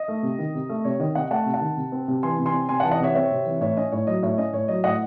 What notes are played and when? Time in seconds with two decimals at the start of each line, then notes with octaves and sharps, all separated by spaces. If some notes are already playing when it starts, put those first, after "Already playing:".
Already playing: D#5
0.08 A3
0.23 C3
0.39 D#3
0.55 C3
0.69 A3
0.85 C3 C#5
1.00 D#3 D#5
1.15 C3 D#5 F#5
1.31 A3 F#5 A5
1.46 C3
1.54 F#5 A5
1.61 D#3
1.77 C3
1.92 C4
2.08 C3
2.23 E3 G#5 C6
2.39 C3
2.46 G#5 C6
2.53 C4
2.69 C3 G#5 C6
2.80 E3 F#5 A5
2.91 D#5 F#5
3.00 C3 C#5 E5
3.15 C4 C#5 E5
3.31 C3
3.46 E3
3.61 A2 C#5 E5
3.77 C#4 D#5
3.92 A2 C#5
4.07 F#3 D#5
4.23 A2 C#5 E5
4.38 C#4 D#5
4.53 A2 C#5
4.68 F#3 D#5
4.84 A2 D#5 F#5